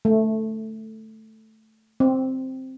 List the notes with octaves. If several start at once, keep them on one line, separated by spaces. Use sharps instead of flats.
A3
C4